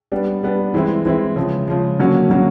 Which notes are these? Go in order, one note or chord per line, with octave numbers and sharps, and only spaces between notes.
G3 B3 D4
G3 B3 D4
E3 G#3 C4 E4
E3 G#3 C4 E4
C#3 F3 G#3
C#3 F3 G#3
D3 F#3 A#3 C#4 F#4
D3 F#3 A#3 C#4 F#4